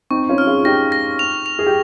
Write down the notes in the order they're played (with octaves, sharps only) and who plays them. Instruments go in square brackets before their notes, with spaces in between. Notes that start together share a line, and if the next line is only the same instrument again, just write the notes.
[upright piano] C4 D#4 [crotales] C#6
[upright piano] C#4 F4
[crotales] F6
[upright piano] F4 G#4
[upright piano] D#4 G4 [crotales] A#6
[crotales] A#6
F7
F7
[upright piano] G#4
G4